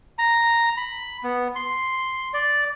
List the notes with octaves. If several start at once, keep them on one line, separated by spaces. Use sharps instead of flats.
A#5
B5
B3
C6
D5